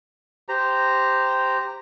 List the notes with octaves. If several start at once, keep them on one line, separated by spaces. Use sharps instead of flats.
G4 C5 A#5